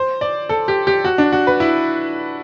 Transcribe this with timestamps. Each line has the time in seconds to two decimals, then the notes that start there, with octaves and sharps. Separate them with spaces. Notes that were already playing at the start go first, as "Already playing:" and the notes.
Already playing: C5
0.21 D5
0.49 A4
0.68 G4
0.87 G4
1.05 F#4
1.18 D4
1.32 F#4
1.47 B4
1.60 E4